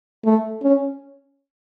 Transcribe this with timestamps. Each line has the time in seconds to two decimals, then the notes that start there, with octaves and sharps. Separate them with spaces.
0.25 A3
0.63 C#4